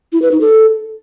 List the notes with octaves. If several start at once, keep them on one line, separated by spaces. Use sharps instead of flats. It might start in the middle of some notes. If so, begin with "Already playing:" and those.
E4
B4
D#4
A4